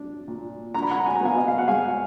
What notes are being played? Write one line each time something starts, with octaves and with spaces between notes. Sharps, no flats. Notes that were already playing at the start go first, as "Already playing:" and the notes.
Already playing: D4
A#2
D4 A#5
B5
F#5 A#5
G#5
A#5
B3 F5 G#5
D#5
F5
F#5
G#3 F5 G#5